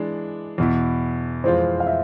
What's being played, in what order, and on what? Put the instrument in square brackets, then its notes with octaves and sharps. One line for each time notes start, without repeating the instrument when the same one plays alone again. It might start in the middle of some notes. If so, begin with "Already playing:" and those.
Already playing: [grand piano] E3 G#3 D4
E2 B2 B3 E4
[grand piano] F2 E3 G#3 C4 F4 [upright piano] C5
[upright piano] F5
E5